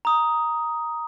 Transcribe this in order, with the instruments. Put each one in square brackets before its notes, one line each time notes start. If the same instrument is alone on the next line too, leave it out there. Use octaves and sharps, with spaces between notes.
[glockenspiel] A#5 D#6